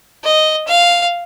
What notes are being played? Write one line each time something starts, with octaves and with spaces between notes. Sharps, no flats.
D#5
F5